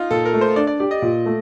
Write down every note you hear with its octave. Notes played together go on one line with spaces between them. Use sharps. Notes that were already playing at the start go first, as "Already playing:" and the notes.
Already playing: D#4 F4
A#2 A4
A#4
A3
C5
D4 D5
D5
G4 D5
D#5
A#2
A3